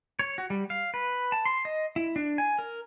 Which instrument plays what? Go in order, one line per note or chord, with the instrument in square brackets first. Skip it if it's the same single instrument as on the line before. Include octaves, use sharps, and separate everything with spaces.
[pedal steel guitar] C#5
F#4
G3
F5
B4
A5
C6
D#5
E4
D4
G#5
A#4